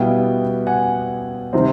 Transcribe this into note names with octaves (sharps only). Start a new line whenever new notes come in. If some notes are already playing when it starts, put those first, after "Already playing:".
Already playing: B2 G3 B3 E4 F5 G5
F#5 G#5
C3 D#3 G3 C4